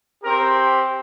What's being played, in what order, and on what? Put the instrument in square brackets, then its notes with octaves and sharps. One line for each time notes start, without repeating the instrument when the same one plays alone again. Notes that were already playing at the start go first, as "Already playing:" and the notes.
[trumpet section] C4 G4 A#4